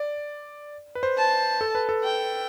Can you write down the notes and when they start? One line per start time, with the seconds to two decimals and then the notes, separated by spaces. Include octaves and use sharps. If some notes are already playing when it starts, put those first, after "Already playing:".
Already playing: D5
0.95 B4
1.03 C5
1.18 A5
1.61 A4
1.75 B4
1.89 A4
2.04 G5